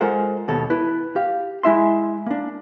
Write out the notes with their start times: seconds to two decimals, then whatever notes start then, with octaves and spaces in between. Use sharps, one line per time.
0.01 G#3 F4 A4 A#4 C5 F#5
0.48 D#2 B2 A4 C#5
0.70 E4 B4
1.16 G4 F5
1.63 G#3 E4 E5 C6
2.26 A#3 D4